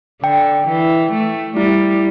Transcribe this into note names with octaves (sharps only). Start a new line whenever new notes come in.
D3 G5
E3
A3
G3 E4